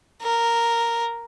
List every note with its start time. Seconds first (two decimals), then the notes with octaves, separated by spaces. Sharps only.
0.22 A#4